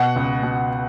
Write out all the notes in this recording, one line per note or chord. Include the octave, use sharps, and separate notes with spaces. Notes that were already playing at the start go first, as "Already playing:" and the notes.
Already playing: B2 F#5
C#2
B2